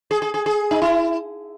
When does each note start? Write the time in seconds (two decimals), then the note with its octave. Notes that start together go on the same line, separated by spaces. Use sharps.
0.11 G#4
0.22 G#4
0.34 G#4
0.46 G#4
0.71 D#4
0.82 E4